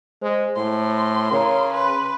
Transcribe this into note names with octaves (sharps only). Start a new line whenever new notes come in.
G#3 C5
A2 C6
C#3 A#4 C#5 A#5
B4 C6